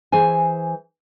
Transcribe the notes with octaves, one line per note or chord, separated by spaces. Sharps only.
E3 G#4 C5 G#5